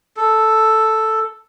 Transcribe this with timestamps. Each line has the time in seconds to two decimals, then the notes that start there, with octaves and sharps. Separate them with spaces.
0.17 A4